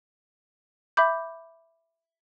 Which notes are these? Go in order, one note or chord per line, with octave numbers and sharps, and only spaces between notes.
E5 B5 D6 G6